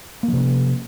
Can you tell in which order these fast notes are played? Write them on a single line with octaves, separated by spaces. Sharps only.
A#3 F3 C3 C#4